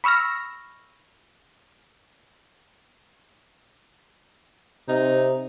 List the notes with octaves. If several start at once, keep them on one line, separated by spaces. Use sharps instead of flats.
B5 C#6 E6 F6 A#6
C3 D#4